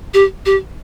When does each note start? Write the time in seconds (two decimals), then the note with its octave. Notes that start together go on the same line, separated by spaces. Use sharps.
0.14 G4
0.46 G4